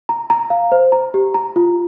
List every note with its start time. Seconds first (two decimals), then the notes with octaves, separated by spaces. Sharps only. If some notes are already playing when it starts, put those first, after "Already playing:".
0.09 A#5
0.30 A#5
0.50 F5
0.72 C5
0.92 A#5
1.14 G4
1.34 A#5
1.56 F4